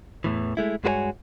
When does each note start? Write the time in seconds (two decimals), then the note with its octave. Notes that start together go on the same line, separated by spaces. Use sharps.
0.24 E2 A2 E3
0.57 G#3 A3 E4
0.84 G2 G#3 F#4 B4 C#5 G#5